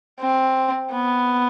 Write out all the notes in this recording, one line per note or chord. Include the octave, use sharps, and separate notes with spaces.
C4
B3